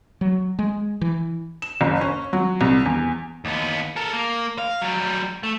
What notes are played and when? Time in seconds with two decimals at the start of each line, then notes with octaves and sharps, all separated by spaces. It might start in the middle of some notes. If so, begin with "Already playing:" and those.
0.21 F#3
0.59 G#3
1.01 E3
1.62 E7
1.81 F#1
2.01 C#4
2.33 F#3
2.61 C2
2.85 E2
3.45 D#2 B3
3.96 A4 A#4
4.13 A#3
4.58 F5
4.82 F#3 G3
5.43 A3